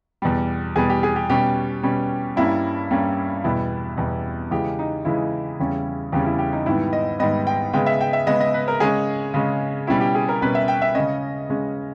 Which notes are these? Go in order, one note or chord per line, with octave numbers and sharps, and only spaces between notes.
E2 B2 G3
E2 B2 G3 G#4
G4
G#4
G4
B2 G3 C#4 G4
B2 G3 C#4
G2 G3 A#3 C#4 E4
G2 G3 A#3 C#4
E2 B2 G3 E4
E2 B2 G3
C#3 E3 G#3 G4
D#4
C#3 E3 G#3 E4
E2 C#3 G3 C#4
E2 C#3 G3 C#4 G4
E4
G4
D#4
G#2 D#3 G3 B3 E4
D#5
G#2 D#3 G3 B3 D#5
G5
C#3 G#3 B3 G5
E5
G5
E5
C#3 G#3 B3 D#5
D#5
B4
A#4
C#3 G#3 C#4 G#4
C#3 G#3 C#4
B2 G3 C#4 E4
G4
G#4
A#4
B2 G3 C#4 B4
E5
G5
E5
C#3 G#3 C#4 D#5
C#3 G#3 C#4